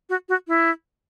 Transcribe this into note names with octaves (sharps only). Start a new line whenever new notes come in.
F#4
F#4
E4